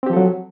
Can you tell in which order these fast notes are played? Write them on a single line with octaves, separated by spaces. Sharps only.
C4 G4 F3 A4 F#3